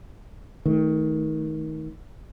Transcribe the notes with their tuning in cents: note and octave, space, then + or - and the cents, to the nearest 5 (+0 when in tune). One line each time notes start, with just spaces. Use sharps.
D#3 +20 A3 -10